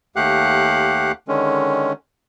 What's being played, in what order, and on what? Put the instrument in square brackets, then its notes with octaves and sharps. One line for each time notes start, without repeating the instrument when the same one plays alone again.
[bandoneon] D#2 A3 G4 F5 F#5 F#6
D3 D#3 G#3 C#4